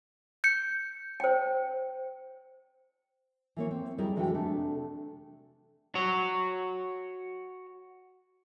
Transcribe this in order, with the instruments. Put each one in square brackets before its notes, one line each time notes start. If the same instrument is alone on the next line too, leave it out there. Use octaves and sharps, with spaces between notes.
[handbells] G6 C#7
[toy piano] C5 G5
[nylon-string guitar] E3 A#3 C#5
C4
G3 E4 G#4 A#4 D#5
D3 E3 G#3 F#4 G5
C3 A3 D4
[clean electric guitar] F#4 C#5